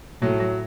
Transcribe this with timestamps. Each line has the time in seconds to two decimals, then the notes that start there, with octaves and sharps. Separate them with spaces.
0.22 A2 F#3
0.40 F#3